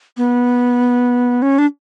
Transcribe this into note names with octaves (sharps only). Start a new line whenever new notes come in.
B3
C#4
D4